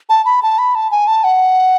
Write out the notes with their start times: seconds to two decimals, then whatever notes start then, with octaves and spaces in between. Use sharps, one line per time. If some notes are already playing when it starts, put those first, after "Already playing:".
0.09 A5
0.25 B5
0.42 A5
0.58 B5
0.75 A5
0.91 G#5
1.07 A5
1.24 F#5